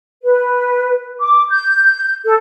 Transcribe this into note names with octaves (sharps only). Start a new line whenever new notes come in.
B4
D6
G6
A4